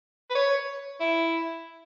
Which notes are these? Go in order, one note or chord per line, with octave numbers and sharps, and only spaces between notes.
B4
C#5
E4